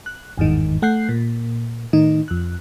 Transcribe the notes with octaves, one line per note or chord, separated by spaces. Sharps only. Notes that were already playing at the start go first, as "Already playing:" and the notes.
F#6
G1 E2 G#2 D#3
A3 F#5 F#6 G6 C7
A#2
A2 D#3 D#4
F2 F#6